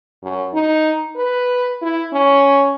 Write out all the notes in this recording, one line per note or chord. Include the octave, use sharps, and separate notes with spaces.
F#2
D#4
B4
E4
C#4